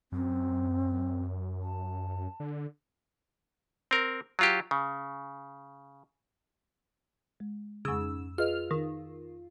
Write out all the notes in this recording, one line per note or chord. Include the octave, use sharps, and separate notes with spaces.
F#2 C4
A5
D3
C4 A#4
F#3 F4 G4
C#3
G#3
F2 G#2 C#3 D#6 E6
F4 G#4 B4 D#5 F6
D#3